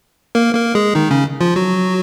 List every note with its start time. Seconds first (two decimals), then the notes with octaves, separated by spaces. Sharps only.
0.35 A#3 A#4
0.55 A#3 A#4
0.75 G#3 G#4
0.95 D#3 D#4
1.11 C#3 C#4
1.41 F3 F4
1.56 F#3 F#4